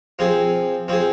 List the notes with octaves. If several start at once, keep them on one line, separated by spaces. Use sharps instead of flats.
F3 C4 G#4
F3 C4 G#4